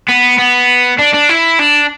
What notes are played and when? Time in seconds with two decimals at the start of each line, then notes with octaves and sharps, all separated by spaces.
0.08 B3
0.38 B3
0.99 D4
1.14 D4
1.29 E4
1.59 D4